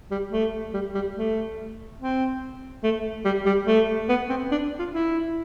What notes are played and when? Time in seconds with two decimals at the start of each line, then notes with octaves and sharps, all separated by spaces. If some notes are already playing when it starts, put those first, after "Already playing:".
0.11 G3
0.32 A3
0.74 G3
0.95 G3
1.16 A3
1.99 C4
2.84 A3
3.25 G3
3.46 G3
3.67 A3
4.09 B3
4.29 C4
4.51 D4
4.79 F4
4.93 E4